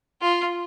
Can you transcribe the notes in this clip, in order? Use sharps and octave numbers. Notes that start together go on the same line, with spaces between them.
F4